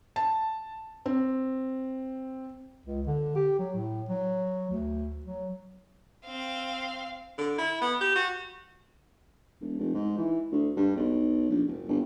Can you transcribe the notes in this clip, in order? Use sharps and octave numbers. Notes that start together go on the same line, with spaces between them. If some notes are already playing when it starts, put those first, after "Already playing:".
A5
C4
C#2
D3
G4
F#3
A2
F#3
D2
F#3
C4 F5
D3
E4
B3
G4
F#4
E1
F1
G#2
E3
D2
G2
B1
A#1
F#1
G1